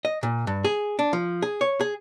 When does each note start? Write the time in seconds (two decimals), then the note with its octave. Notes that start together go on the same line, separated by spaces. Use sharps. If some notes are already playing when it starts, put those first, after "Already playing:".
0.05 D#5
0.23 A#2
0.47 G2
0.64 G#4
0.99 D4
1.13 F3
1.42 G#4
1.61 C#5
1.81 G#4